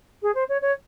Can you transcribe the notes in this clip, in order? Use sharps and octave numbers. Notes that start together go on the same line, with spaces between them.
G#4
C5
C#5
C#5